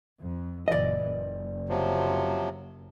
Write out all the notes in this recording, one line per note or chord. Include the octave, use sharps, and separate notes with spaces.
F2
F#1 A#2 E3 D5 D#5
F#1
C3 F3 F#3